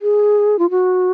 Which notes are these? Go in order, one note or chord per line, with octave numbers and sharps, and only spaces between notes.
G#4
F4
F#4